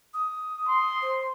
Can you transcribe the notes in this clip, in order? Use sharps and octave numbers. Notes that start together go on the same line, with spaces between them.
D#6
C6
C5